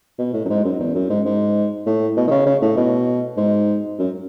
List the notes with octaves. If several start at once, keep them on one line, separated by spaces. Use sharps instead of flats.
B2
A2
F#2
G#2
F#2
E2
F#2
G#2
G#2
A2
B2
D#3
C#3
C#3
A2
B2
G#2
F#2